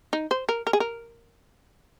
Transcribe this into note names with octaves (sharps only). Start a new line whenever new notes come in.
D#4
C5
A#4
A#4
G#4
A#4